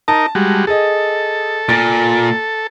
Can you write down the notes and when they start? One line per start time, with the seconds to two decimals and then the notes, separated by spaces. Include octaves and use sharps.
0.08 D#4 A#4 A5
0.35 G3 G#3 F#4
0.67 G#4 A4 D#5
1.69 A#2 A6